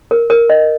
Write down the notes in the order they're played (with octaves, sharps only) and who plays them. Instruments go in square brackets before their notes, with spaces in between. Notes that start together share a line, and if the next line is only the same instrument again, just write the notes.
[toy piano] A#4
A#4
D#5